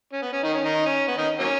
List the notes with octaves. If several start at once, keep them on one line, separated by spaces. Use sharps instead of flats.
C#4
B3
C#4
D#3 D#4
C#4
D#3 D#4
C#4
B3
D#3 D#4
F#3 A#3 C#4